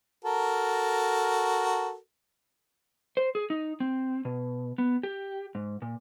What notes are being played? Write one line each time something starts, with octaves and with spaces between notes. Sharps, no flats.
F#4 A4 A#4
C5
G#4
D#4
C4
B2
B3
G4
G#2
A#2